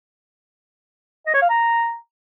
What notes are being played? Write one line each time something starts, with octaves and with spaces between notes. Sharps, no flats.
D#5
C#5
F5
A#5